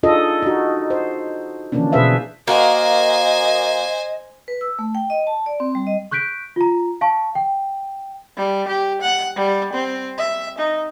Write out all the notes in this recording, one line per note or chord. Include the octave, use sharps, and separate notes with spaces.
D4 D#4 F4 G#4 A4 D#5
D#4 F#4
C5
D3 E3 F3 A#3 C#4 D4
B2 G#4 B4 C5 E5 F5
A#3 F#4 C5 D#5 G#5
B4
E6
A3
G5
D#5
A5
D5
C4
G3
D#5
C#6 F#6 G6 B6 D7
F4 A#5
F5 A5 C#6
G5
G3
G4
F#5
G3
C4
E5
D#4